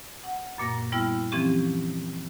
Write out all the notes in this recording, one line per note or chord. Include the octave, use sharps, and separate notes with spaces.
F#5
F#2 A#2 A#3 A#6
G3 B3 E4 G5 F6
E3 F3 C4 C#4 G4